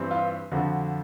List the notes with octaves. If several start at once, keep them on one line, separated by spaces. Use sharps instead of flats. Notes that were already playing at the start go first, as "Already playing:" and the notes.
Already playing: G2 E3 G3 C4
F4
F2 D3 F3 F#4